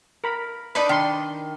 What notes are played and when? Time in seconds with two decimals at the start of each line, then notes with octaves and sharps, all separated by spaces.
0.24 A#4 B5
0.75 D4 D#4 B4 B5
0.89 D#3 D4 C6